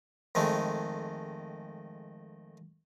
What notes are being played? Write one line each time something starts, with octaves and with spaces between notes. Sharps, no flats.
F2 D#3 G#3 A3